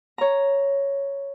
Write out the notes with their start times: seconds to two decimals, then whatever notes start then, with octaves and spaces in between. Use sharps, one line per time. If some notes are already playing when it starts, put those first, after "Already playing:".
0.18 C#5 A#5